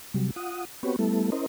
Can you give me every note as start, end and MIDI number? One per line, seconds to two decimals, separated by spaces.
0.14 0.31 48
0.14 0.31 54
0.14 0.31 55
0.36 0.65 65
0.36 0.65 78
0.36 0.65 87
0.83 0.96 59
0.83 0.96 60
0.83 0.96 66
0.83 0.96 67
0.83 0.96 71
0.83 0.96 73
0.99 1.30 55
0.99 1.30 57
0.99 1.30 59
0.99 1.30 64
0.99 1.30 69
1.32 1.46 61
1.32 1.46 64
1.32 1.46 70
1.32 1.46 72
1.32 1.46 75